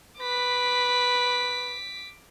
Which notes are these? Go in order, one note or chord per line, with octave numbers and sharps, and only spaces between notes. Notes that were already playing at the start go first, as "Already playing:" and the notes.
B4 D6 B6